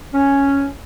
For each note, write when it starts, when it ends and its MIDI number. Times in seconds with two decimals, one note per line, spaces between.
0.13 0.65 61